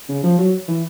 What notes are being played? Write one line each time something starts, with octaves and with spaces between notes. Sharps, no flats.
C#3
F3
F#3
E3